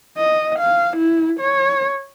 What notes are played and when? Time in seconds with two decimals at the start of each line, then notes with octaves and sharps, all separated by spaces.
0.18 D#5
0.59 F5
0.97 E4
1.40 C#5